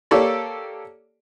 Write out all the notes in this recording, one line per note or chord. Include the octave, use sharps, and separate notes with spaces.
A#3 G4 A4 C#5 D5